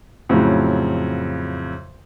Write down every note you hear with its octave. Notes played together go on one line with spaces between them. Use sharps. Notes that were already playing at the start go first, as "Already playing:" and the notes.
F2 A2 C#3 F#3